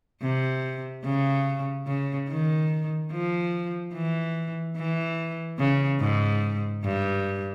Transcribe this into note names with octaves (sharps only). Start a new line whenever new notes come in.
C3
C#3
C#3
D#3
F3
E3
E3
C#3
G#2
G2